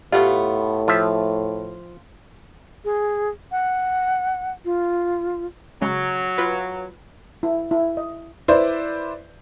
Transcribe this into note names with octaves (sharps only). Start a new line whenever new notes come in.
A2 A3 B3 F4 G4
F3 F4 E5
G#4
F#5
F4
C#3 F#3 G#3
F4 B4
E4
E4
D#5
E4 B4 C5 D5